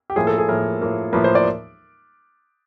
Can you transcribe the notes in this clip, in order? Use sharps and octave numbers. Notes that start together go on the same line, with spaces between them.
G4
A2 F3 A#3 G#4
A4
G#4
A2 F3 A#3 A#4
A2 F3 A#3
A2 F3 A#3 B4
C5
D5